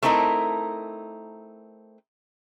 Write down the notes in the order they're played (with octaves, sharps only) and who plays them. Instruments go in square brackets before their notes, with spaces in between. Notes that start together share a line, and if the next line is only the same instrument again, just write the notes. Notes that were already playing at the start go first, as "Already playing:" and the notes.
[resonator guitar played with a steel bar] A3 C4 D#4 E4 A#4